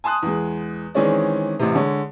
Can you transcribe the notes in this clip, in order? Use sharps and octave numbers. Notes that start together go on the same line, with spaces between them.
G#5 A5 C6 D#6 F#6
E2 G#3
D#3 E3 G#3 C4 C#4 D5
A1 A2 C3
D3 G#3 C#5